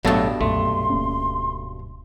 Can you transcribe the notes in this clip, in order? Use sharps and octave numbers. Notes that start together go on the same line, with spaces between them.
A1 G2 B2 F#3 A3 A4
B1 F#2 A#2 A3 C6
D1 A#3 C#4